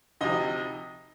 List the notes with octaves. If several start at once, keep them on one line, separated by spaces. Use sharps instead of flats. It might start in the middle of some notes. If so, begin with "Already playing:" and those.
D2 C3 F3 D#4 D#5